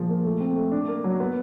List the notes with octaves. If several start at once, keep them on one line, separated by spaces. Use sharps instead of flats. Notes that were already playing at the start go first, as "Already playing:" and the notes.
Already playing: A#2 F3 G#4
A#3
A3
C4
A3
D4
A#3
F#3
B3